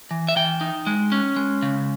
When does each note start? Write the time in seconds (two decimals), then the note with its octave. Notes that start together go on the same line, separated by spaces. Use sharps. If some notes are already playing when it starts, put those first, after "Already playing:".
0.11 E3
0.28 E5
0.36 E3 G5
0.61 D#4
0.87 G#3
1.12 C#4
1.36 G#3
1.62 C#3